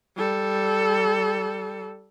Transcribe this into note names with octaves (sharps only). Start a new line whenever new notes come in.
G3 A4